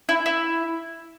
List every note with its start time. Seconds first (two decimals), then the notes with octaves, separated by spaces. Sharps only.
0.09 E4
0.26 E4